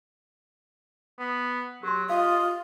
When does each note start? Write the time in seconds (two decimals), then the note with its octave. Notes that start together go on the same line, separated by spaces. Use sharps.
1.19 B3
1.83 F#3 G4 C6
2.10 F4 D#5 F5